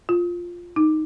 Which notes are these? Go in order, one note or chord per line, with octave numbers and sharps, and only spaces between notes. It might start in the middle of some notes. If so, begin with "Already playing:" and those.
F4
D#4